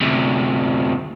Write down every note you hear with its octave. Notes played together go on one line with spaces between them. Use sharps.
D2 C3